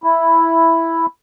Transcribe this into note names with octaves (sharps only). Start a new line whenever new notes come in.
E4